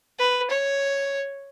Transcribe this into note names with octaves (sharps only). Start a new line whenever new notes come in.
B4
C#5